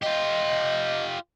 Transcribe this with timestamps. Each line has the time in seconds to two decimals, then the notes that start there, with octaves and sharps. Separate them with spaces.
0.02 F4 G4 D#5